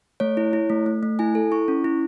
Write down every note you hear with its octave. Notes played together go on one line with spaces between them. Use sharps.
A3 C#5
E4
E4
A3
A3
A3
E4 G#5
A4
E4 C#6
C#4
E4